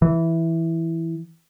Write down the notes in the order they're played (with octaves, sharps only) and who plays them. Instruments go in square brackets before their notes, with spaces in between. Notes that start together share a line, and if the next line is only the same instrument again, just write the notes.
[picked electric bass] E3